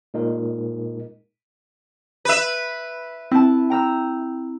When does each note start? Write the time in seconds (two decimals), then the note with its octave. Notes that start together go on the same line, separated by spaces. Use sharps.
0.14 A#2 G#3 D#4 A#4
2.25 B4 E5
3.32 C4 E4 A5
3.70 G5 A#5 E6